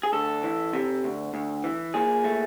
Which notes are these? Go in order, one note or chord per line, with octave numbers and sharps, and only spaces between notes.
G#4
D2 A4
E3
C3
D2
D2
E3
A#2 G#4
A3